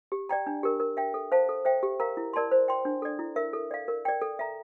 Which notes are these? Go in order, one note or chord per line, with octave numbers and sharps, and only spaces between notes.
G4
D5 G5 A#5
D4
G4 A#4
A#4
E5 G5
A4
C5 F5 A5
A4
C5 E5 G5
G4
A#4 F5 A#5
E4
A#4 D5 A5 C6
C5
G5 C6
D4
A4 D5
E4
A#4 E5
A4
D5 F5
A#4
D5 G5
A4
E5 A#5